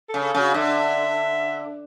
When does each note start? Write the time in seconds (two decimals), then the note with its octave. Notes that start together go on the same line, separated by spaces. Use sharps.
0.09 C#3 A4
0.24 A4
0.34 C#3 F#4
0.54 D3 E5